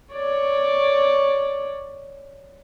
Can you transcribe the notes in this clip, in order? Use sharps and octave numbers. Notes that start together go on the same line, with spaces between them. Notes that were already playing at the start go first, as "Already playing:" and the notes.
C#5 D5